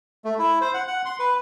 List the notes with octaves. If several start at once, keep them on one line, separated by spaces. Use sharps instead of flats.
A3
E4
C5
F#5
F#5
C6
B4